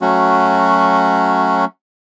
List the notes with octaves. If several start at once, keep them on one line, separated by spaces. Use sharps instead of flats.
F#3 A3 C#4 F#4